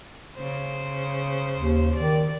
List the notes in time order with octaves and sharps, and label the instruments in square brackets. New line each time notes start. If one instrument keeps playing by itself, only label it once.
[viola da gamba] C#3 C5
[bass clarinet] D#2
[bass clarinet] D#3 [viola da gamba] D5